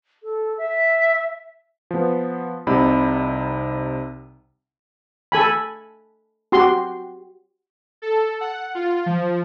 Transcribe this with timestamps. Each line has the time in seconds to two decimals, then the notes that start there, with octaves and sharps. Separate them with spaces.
0.23 A4
0.58 E5
1.91 F3 B3
2.67 C2 C3 D#4 B5
5.32 A4 G#5 B5
6.52 F#4 G4 C6
8.02 A4
8.41 F#5
8.75 F4
9.06 F3